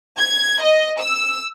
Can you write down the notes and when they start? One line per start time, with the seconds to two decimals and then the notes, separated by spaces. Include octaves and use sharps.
0.18 G#6
0.62 D#5
1.01 E6